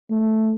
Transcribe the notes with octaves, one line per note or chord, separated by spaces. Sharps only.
A3